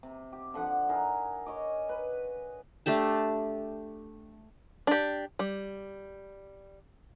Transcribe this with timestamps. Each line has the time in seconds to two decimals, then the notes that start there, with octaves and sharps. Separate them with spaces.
0.03 C3
0.33 G4
0.54 D3 F3 F#5
0.89 E4 G#4 A#4
1.46 C#5 D#5 D6
1.89 B4
2.86 A3 D4 G4 A5
4.87 D4 G4
5.39 G3